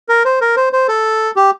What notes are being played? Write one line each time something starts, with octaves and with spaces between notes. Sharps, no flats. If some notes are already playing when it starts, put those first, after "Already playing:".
A#4
C5
A#4
C5
C5
A4
G4